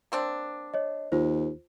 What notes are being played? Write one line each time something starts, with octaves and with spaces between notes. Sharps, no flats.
A#3 C4 D4
C#5 D#5
D#2 F4 C5